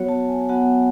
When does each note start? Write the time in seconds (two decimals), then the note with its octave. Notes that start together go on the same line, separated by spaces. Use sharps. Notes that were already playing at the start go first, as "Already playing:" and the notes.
Already playing: F#3 B3 F#4 C#5
0.09 A5
0.28 G#5
0.49 F#3 B3 F#4 F#5